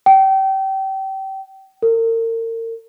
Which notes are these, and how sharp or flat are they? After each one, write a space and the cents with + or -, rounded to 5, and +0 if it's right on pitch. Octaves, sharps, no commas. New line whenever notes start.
G5 -30
A#4 -40